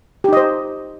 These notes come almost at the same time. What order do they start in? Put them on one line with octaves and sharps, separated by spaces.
G4 D#4 D#5 C5